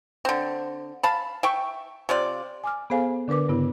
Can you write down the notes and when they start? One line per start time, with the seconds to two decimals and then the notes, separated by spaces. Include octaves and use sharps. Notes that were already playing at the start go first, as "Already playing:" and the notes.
0.25 D3 C4
1.03 F5 A5 B5
1.43 E5 G5 C#6
2.09 C3 F4 D5
2.64 G#5 D6 F6
2.90 B3 G#4 A4 C5 F5 G#5
3.28 D3 D4 A#4 B4 D6
3.48 G2 C#3 B3 E4